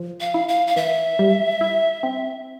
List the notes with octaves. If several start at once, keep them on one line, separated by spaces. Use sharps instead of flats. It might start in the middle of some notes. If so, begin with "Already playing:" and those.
Already playing: F3
F5
E4
F5
F5
E3 E5
G3
E4
C4